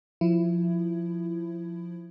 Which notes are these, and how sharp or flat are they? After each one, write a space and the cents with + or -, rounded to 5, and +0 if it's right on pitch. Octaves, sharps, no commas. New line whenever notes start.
F3 +10 E4 +20